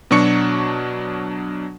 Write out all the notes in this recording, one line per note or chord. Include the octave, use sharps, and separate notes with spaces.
B2 F#3 D4 C#6 C#7